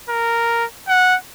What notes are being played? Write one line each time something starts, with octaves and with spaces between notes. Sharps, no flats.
A#4
F#5